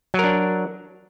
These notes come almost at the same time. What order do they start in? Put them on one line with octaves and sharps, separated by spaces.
F#3 A#4 D4